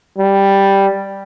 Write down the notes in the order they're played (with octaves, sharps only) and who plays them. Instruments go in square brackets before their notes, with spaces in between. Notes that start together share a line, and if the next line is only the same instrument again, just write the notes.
[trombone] G3